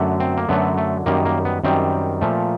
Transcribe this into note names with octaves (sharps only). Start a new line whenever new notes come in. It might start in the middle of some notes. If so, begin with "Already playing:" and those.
Already playing: F#2 D3 F#3 A3
C4
A#3
F#2 D3 F#3 A3 B3
A3
F#2 D#3 G3 A#3
A#3
B3
F#2 D#3 G3 C4
A#2 F3 A3